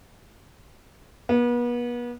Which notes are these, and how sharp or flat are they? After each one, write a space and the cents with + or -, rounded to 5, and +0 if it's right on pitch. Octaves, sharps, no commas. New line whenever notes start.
B3 -35